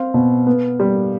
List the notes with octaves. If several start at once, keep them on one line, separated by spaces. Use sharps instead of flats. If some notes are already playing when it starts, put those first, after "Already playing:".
Already playing: C4 F5
B2
B3
G3